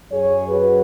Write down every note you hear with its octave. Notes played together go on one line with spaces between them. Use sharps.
F#2 F#3 G#4 C#5
F#4 B4